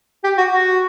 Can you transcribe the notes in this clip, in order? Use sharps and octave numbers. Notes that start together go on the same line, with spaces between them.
G4
F#4
F#4